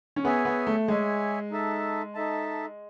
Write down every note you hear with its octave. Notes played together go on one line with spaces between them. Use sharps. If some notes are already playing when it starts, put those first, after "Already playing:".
C#4
B3 G#4 C#5 E5 G#5
B3
A3
G#3 G#4 C#5 E5 G#5
D#4 A4 E5 A5
D#4 A4 E5 A5